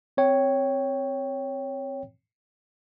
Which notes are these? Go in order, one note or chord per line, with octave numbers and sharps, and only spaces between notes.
C4 C#5 G5